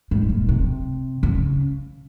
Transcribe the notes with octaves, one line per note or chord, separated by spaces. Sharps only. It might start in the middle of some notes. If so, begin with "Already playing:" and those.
G#2
A#2
C3
C#3